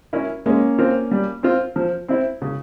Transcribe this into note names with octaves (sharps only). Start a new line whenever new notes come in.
C#4 E4 A#4
G#3 A#3 C#4
C4 F4 A#4
G3
C4 F4
F3
C4 E4
C#3